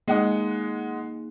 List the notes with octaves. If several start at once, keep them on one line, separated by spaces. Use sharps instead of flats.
G#3 A#3 D#4 G#4 F#5 D#6